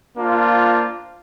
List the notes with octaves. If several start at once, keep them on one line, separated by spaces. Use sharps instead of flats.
A#3 D4 F4 C5